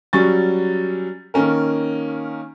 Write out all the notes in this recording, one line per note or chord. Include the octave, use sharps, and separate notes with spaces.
F#3 G3 C#4 C#6 A6
D#3 A#3 C#4 A#4